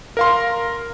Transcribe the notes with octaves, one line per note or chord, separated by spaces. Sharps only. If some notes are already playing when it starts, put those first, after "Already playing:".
A#4 F5 C6